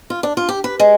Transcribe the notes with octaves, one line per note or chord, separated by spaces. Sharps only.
F4
D4
F4
G4
B4
G#3